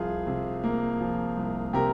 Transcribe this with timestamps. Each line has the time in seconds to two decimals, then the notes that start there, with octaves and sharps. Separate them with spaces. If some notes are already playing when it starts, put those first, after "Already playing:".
Already playing: C2 F3 F4 G#4
0.27 C3
0.64 A#3
1.01 F3
1.37 C2
1.73 C3 G4 A#4